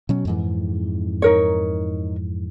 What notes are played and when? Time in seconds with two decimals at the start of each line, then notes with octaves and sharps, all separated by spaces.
0.09 B2 F#3 C#4
0.25 F2 G#2 E3
1.22 D#4 A#4 C#5